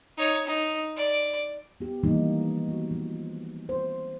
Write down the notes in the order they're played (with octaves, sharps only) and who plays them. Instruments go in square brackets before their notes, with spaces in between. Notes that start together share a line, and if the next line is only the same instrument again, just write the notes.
[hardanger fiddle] D#4 C#5
D#4
D5
[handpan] B3 G4
D#3 E3 G3 G#3 A#3 D#4
B3 F#4
F3
C5